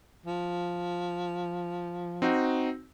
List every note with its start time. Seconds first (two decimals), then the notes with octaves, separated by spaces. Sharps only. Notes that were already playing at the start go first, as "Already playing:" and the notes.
0.26 F3
2.22 C4 D#4 F#4